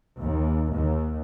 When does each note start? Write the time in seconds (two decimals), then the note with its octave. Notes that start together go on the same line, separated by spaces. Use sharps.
0.18 D#2
0.74 D#2